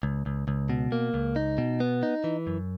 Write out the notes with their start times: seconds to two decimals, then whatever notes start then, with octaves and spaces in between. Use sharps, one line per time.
0.03 C#2
0.26 C#2
0.48 C#2
0.69 B2
0.92 A#3
1.14 C#2
1.36 D#4
1.58 B2
1.80 B3
2.03 D#4
2.24 E3
2.47 F#2